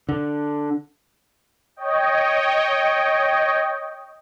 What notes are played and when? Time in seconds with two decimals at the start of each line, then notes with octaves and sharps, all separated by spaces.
0.09 D3
1.76 C#5 D#5 G5